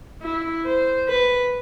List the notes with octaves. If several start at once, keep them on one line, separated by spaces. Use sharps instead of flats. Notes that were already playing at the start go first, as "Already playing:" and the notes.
E4
C5
B4